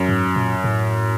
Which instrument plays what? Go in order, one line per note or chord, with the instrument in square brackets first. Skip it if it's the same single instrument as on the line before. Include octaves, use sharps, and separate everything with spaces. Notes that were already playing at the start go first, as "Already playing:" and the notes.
Already playing: [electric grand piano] F#2
[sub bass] G#2
A#2
A2